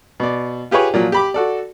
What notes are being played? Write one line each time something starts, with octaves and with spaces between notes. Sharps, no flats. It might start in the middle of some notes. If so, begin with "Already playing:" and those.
B2 D5
F4 G4 G#4 B4 C#5
A#2 F3 F#3
G4 B5 D6
F#4 A4 D5